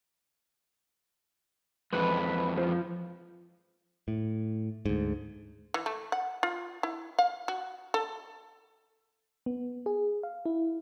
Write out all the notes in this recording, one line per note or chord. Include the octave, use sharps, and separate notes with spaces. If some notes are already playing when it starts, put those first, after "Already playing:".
F2 E3 G#3 B4
F3
A2
D2 G#2
E3
A3
F#5
F4
E4
F5
F#4
A4
B3
G#4
F5
E4